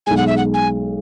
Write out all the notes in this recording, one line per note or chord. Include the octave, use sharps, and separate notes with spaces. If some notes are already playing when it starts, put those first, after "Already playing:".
B1 B2 G#3 G#5
F#5
E5
F#5
G#5